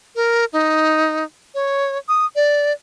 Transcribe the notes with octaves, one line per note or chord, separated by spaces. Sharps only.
A#4
D#4
C#5
D#6
D5